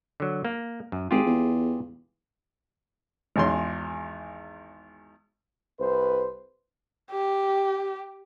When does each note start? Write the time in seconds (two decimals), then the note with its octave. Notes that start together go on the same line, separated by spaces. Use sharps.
0.20 D3 F#3
0.45 A#3
0.92 F#2
1.11 G#1 F4 G4 G#4
1.26 E2
3.36 G#1 E2 C6
5.80 C2 B4 C5
7.11 G4